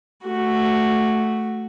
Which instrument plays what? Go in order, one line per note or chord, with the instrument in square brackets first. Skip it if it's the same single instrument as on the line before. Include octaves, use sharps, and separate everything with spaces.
[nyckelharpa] A3 F#4